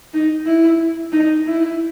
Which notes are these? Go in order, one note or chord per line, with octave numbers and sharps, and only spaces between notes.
D#4
E4
D#4
E4